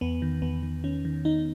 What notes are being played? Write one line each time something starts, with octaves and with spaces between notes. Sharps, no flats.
E2 B3
D#3
E2 B3
D#3
D#3 C#4
D#3
D#3 D#4